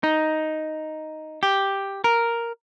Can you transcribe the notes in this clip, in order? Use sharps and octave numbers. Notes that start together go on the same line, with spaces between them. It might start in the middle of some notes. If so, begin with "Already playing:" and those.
D#4
G4
A#4